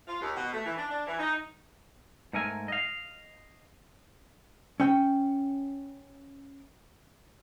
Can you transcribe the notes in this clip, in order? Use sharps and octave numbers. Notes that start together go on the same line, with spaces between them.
F4
D#2
B2
A3
E3
D4
D4
E3
D#4
G#2 A3 A#4 G#5
D#5 F5
C#4 G5